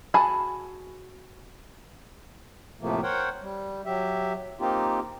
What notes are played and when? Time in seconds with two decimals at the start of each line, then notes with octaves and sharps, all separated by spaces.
0.14 F#4 G#4 G#5 A5 B5
2.81 A2 C3 F3 A3 A#3
3.03 A#4 C5 C#5 F#5 G5
3.41 G3
3.86 F#3 G4 E5
4.60 A#3 C4 D#4 F4 G4